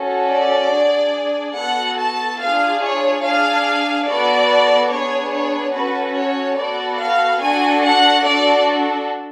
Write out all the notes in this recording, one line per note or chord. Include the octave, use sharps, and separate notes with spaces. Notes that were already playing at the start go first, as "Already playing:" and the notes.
Already playing: C#4 F#4 A4
D5
D4 G#4
B3 F#4 A4 F#5
A5
D4 F4 G#4 F5
C#5
D4 G#4 F5
B3 F#4 A4 D5
B3 D4 G#4 C#5
C#5
C#4 F#4 A4 B4
C#5
B3 F#4 A4 D5
F5
D4 F#4 A4 G#5
F#5
D4 F#4 A4 D5